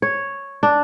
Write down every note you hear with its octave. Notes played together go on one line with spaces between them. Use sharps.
C#5
D4